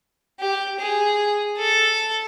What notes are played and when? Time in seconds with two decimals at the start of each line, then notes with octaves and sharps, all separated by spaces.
0.40 G4
0.79 G#4
1.58 A4